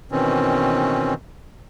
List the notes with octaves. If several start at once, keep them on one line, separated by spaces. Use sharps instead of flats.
B2 D#3 E3 C4 C#4